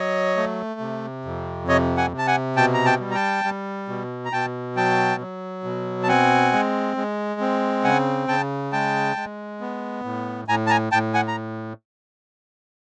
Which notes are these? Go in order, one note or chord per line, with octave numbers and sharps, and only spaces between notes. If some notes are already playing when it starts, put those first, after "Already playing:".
Already playing: F#3 C#5 D#5
A3
C3
F2
C3 C#5 D#5
F#5 G#5
C3
A5
F#5 G#5
B2 G5 A5
A#5
G5 A5
G3
A#5
G5 A5
G3
B2
A#5
B2 G5 A5
F#3 G5 A5
F#3
B2
A5
C4 F#5 G#5
G#3
G#3
C4
C#3 F#5 G#5
C#3 G5 A5
G#3 G5 A5
G#3
B3
A2
A2 G#5 A#5
A5
G#5 A#5
A2 G5 A5
F#5 G#5
A#5